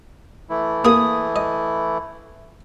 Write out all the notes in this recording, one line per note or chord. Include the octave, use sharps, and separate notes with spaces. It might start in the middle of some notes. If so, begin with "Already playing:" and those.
E3 A3 E4
A#3 G#4 D#6
D#5